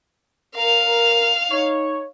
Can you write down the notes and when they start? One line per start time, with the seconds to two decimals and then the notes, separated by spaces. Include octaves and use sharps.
0.56 A#4 F5 F7
1.51 D#4 C#5